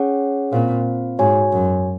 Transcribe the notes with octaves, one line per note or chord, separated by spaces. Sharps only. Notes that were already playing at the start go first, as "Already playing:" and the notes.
Already playing: C#4 G#4 C#5 F#5
A#2 C4 F4 C5 F5
G#2 F#4 C#5 G#5
F#2